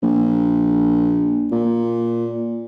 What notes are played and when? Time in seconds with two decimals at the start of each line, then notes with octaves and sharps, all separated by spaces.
0.03 A#1
1.52 A#2